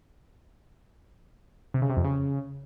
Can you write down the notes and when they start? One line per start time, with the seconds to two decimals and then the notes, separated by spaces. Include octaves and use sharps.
1.74 C3
1.82 C#3
1.89 C3
1.97 F2
2.04 C#3